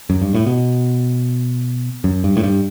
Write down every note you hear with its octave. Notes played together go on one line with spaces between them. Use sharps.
F#2
G2
A2
B2
F#2
G2
A2
G2